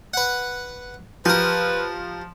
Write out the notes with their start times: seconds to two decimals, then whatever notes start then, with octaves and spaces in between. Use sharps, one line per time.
0.14 B4 F#5
1.26 F3 G4 A#4 B4